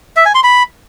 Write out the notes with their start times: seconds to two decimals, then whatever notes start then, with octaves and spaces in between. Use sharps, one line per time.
0.17 E5
0.26 G#5
0.35 C6
0.44 B5